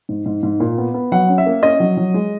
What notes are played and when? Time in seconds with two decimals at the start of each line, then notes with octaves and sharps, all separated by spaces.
0.09 G#2
0.26 G#2
0.43 G#2
0.60 A#2
0.78 B3
0.94 B3
1.12 F#3 F#5
1.29 C#4
1.38 E5
1.46 A#3
1.63 C#4 D#5
1.80 F#3
1.97 F#3
2.14 G#3